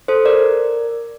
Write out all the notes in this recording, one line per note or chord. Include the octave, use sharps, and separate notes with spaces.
A4 C5
A#4 D5